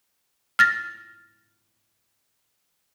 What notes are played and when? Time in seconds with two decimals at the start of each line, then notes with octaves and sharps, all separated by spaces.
0.59 F6 A6 A#6